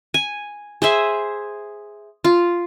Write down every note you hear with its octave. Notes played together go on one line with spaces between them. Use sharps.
G#5
G#4 C5 E5 G#5
F4